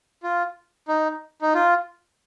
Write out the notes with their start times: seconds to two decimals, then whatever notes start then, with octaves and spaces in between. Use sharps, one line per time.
0.23 F4
0.88 D#4
1.42 D#4
1.54 F4